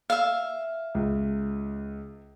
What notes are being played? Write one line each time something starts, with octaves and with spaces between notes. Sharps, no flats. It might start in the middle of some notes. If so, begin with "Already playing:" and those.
E5 F5
C#2